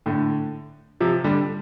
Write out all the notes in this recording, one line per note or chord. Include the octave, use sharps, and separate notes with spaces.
A2 D3
C3 F3
D3 G3